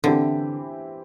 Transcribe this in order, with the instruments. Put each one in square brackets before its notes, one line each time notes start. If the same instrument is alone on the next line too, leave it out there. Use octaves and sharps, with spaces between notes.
[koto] D3 [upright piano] E3 C4 E4 G4